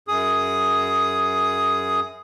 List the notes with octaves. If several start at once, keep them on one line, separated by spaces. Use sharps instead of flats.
F#2 G#4 D#6